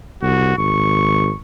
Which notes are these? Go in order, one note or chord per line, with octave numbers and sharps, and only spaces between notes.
C2 F#4
G#1 C#6